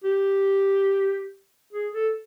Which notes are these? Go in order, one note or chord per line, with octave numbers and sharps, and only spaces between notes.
G4
G#4
A4